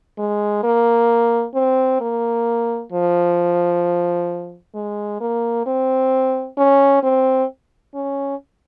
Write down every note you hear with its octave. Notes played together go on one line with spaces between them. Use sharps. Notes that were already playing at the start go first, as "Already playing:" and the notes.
G#3
A#3
C4
A#3
F3
G#3
A#3
C4
C#4
C4
C#4